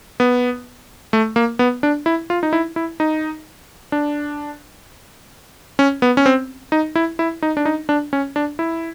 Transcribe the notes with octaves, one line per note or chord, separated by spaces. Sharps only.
B3
A3
A#3
B3
D4
E4
F4
D#4
E4
E4
D#4
D4
C#4
B3
C#4
C4
D#4
E4
E4
D#4
D4
D#4
D4
C#4
D4
E4